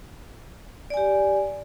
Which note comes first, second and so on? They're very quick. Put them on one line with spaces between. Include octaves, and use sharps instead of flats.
D5 G#5 G4